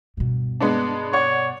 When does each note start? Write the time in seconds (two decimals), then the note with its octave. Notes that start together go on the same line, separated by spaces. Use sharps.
0.17 G2 B2
0.60 G#3 B3 D4
1.13 C#5 D5 F#5 C#6